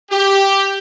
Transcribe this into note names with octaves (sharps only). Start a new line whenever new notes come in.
G4